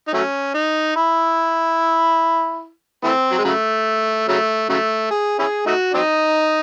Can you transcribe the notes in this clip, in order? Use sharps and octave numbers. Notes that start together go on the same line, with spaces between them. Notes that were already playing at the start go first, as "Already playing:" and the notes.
D#4
F#3 A3 C#4
D#4
E4
E3 A3 C4
F#3
G#3
C#3 F#3 A3
C#3 F#3 A3
C#3 F#3 A3
G#4
C#4 E4 G#4
A3 D#4 F#4
F#3 C4 D#4